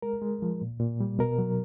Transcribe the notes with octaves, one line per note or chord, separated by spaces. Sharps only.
G#3 A#4
G#3
F3
A#2
A#2
G3
B2 A#4
F#3